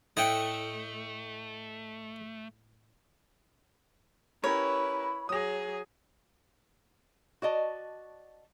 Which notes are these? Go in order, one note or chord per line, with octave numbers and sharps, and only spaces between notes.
A2 A3 D#5 F#5 G5
C#4 E4 G4 A#4 B4 C#5 B5
F#3 G#4 C#5 D#6 A#6
F#4 D5 D#5 A5